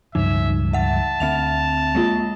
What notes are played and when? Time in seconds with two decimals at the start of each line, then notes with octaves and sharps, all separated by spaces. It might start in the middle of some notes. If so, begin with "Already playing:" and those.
0.15 C#2 G2 F3 D#4 E5
0.73 E5 F#5 A5
1.20 D2 C4 E5 F7
1.95 G#3 A#3 F4